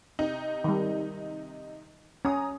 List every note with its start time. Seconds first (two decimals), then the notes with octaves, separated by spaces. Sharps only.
0.19 C3 D#4
0.64 D#3 G3
2.25 C#4 A#5 D#6